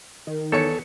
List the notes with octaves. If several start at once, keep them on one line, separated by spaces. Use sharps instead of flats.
D#3
E2 A4 C#5 C#7